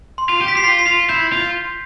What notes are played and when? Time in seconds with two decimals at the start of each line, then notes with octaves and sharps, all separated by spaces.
0.18 C6
0.29 F4
0.41 G4
0.48 B6
0.56 G4 C7
0.64 F4 B6
0.79 C7
0.87 F4
1.09 E4 G6
1.33 F4